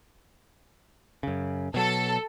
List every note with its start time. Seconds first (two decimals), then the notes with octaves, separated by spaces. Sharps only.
1.23 F#2 C#3
1.74 B2 F#3 A4